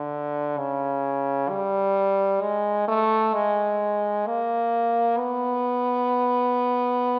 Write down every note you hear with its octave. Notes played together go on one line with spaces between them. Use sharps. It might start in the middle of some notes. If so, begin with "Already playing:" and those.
Already playing: D3
C#3
G3
G#3
A3
G#3
A#3
B3